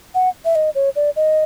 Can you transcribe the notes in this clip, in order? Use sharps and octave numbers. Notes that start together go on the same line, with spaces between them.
F#5
E5
D#5
C#5
D5
D#5